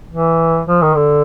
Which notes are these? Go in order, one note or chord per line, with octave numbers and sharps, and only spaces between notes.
E3
F3
D#3
D3